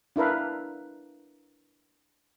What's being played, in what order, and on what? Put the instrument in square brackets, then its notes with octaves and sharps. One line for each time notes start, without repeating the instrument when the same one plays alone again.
[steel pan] D4 E4 A#4 B4 F5